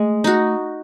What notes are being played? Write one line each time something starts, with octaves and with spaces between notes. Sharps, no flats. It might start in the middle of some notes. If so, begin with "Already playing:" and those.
Already playing: G#3 A3
D#4 F#4